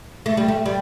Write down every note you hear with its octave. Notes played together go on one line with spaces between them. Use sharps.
A3
G3
A3
G3